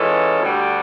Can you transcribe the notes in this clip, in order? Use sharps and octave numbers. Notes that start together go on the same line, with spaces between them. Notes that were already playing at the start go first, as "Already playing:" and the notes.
Already playing: E3 G#3 C#4 F4 A4
D2 D3 G3